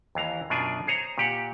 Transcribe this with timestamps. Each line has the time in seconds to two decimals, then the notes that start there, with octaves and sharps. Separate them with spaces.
0.15 D#2 E3 F5 A#5
0.50 F#2 B2 D4 F4 D5 G#5
0.87 G#4 C5 C#5 A#5
1.18 A#2 G4 F#5